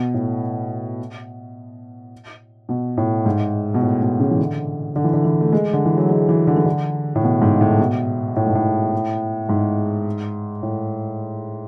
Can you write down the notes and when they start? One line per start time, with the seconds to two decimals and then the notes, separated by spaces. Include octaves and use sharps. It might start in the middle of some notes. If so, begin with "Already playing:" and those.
Already playing: B2
0.14 A2
2.69 B2
2.97 A2
3.26 G#2
3.74 B2
3.82 A2
4.02 B2
4.20 C#3
4.31 E3
4.39 D3
4.96 D3
5.04 E3
5.13 D3
5.24 E3
5.41 A3
5.53 G#3
5.73 D3
5.86 E3
5.97 F#3
6.10 G#3
6.29 E3
6.47 D3
6.57 E3
6.66 D3
7.15 A2
7.23 B2
7.41 G#2
7.61 A2
7.79 B2
8.36 A2
8.46 G#2
8.55 A2
9.49 G#2
10.63 A2